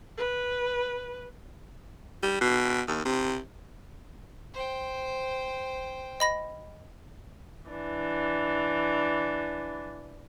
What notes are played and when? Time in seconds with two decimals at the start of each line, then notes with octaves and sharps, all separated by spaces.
0.18 B4
2.23 G3
2.41 B2
2.87 D#2
3.05 C3
4.54 C5 G5
6.20 D#5 B5 A#6
7.70 E3 D4